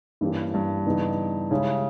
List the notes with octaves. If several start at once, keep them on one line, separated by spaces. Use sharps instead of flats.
G2 E3 A#3 C#4 G4
G2
C#3 E3 G3 B3 D#4
C#3 G#3 C#4 E4 G4